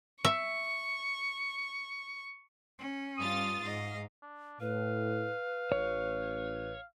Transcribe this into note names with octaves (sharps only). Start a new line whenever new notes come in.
E5 C#6
C#4
G2 F4 D#6 A6
G#2 D#5 F5
D4
A2 B4 F5
A1 C#5